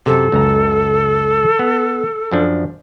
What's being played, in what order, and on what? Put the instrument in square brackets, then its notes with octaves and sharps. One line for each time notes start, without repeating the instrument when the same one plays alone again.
[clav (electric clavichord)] F#2 C3 [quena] A4
[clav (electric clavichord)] C#2 F#2 A#5
B3
F#2 F3 D4